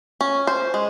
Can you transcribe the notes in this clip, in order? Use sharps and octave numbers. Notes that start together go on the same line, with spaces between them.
C#4
C5
G#3